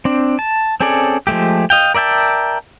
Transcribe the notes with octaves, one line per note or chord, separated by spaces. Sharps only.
C4 D4
A5
C4 C#4 G#4 A4 D5
F3 G#3 A3 G4
D#5 F5 G5
A#4 D5 E5 G5 A5